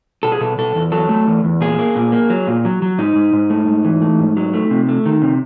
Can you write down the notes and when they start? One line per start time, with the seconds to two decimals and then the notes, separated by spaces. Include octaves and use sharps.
0.23 B2 A4
0.32 G#4
0.41 B2 A4
0.58 B2 A4
0.75 E2
0.92 F#3 A4
1.09 A3
1.27 E2
1.44 E2
1.61 A#2 G#4
1.79 A#3
1.96 A#2
2.12 A#3
2.30 F#3
2.48 A#2
2.65 F#3
2.82 F#3
2.98 G#2 D#4
3.15 G#2
3.33 G#2
3.50 A3
3.68 G#2
3.85 E3
4.02 A3
4.20 G#2
4.37 F#3
4.54 A3
4.70 C3
4.89 A3
5.06 D#3
5.22 C3